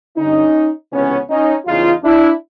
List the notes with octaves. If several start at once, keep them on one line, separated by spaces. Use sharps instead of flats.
G2 D3 C#4 D#4
C#2 C3 E3 B3 C#4
C#4 D#4
E2 C#3 E3 D#4 F4
D4 E4